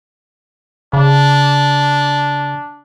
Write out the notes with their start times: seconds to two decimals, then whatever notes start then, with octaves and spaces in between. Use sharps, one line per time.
0.93 C#3 D4